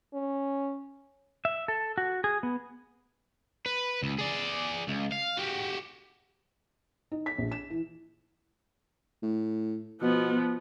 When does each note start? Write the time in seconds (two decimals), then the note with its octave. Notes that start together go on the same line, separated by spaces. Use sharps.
0.14 C#4
1.45 E5
1.68 A4
1.98 F#4
2.24 G#4
2.43 B3
3.66 B4
4.02 C#2
4.19 G#4 D5
4.88 C#2
5.12 F5
5.37 F#4 G4
7.12 D#4
7.26 B6
7.38 A#1
7.52 E7
7.70 E3
9.22 A2
10.02 B2 F3 B3